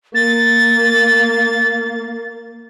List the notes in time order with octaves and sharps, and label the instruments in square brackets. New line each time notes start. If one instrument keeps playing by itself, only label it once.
[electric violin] A#3 [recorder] A6